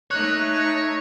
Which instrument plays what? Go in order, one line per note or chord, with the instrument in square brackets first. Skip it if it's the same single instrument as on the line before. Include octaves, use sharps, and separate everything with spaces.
[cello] A3 D#4 [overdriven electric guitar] C#5 [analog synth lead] F#6